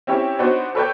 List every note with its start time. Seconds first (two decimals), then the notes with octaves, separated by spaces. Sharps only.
0.07 C4 C#4 E4 G4 C#5
0.39 B3 D4 D#4 F#4 C5 C#5
0.75 A4 B4 C#5 D5 G5 G6